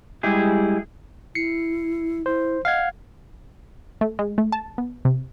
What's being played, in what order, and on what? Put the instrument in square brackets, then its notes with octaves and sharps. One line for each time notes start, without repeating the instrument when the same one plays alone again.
[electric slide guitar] G3 G#3 E4 G4 G#4
[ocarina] E4 [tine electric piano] C7 C#7
[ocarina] E4 [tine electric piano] C5
[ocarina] D#5 [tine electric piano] F5 F#5 G#6
[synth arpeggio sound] A3
G#3
A3
A5
B3
C3